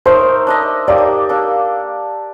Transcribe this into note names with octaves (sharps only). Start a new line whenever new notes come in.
A3 D#4 A#4 C5
D4 A4 D#5
A#3 D#4 G4 D5
A#3 D4 A4